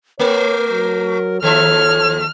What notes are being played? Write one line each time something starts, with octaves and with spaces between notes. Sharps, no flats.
A3 A#4 C#5
F#3
D#2 F3 A4 C#5 E5 F6